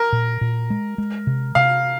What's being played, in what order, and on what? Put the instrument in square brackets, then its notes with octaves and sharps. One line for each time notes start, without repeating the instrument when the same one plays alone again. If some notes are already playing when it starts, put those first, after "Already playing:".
Already playing: [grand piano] A#4
[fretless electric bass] A#2
A#2
G#3
G#3
C3
[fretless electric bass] C3 [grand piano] F5